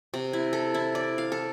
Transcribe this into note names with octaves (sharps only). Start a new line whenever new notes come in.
C3
E4
A4
E4
D5
F5
A4